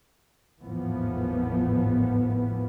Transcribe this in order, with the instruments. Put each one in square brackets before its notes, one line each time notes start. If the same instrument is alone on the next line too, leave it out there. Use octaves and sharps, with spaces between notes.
[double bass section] G#1 E2 A2 E3 F3 B3